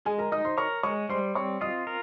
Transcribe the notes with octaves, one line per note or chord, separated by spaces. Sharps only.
G#3 G#4 G#5
A#4 A#5
D#4 D#5 D#6
C5 C6
A#4 C#5 C#6
G#3 C#5 C#6
G3 C5 C6
C4 C#5 C#6
F4 D#5 D#6
A#4